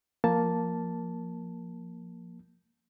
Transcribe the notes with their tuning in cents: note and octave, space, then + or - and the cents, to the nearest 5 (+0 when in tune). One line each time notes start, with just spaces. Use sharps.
F3 +0 A#3 +0 A5 +0